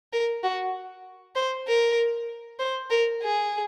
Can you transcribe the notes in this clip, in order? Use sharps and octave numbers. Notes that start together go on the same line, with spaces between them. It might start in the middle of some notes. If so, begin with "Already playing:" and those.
A#4
F#4
C5
A#4
C5
A#4
G#4